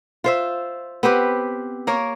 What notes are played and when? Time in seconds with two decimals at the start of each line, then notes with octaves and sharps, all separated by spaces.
0.24 F4 C5 E5
1.03 B3 C4 G4 B4
1.87 A#3 A#4 C#5